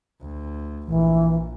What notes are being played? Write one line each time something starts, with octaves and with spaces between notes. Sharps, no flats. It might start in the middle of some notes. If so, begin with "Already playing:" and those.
D2
A#1 E3